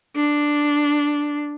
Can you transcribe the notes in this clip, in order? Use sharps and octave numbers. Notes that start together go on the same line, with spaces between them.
D4